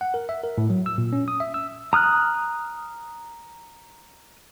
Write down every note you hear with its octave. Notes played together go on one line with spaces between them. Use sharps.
F#5
A#4
E5
A#4
A2
F#3
E6
A#2
C#4
D#6
E5
E6
A#5 D#6 F6 F#6